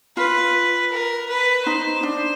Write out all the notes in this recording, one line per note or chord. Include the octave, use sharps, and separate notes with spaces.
F4 B4
A#4
B4
D#4 C5
D4